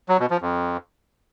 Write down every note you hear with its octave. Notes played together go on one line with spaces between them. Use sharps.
F#3
B2
F3
F2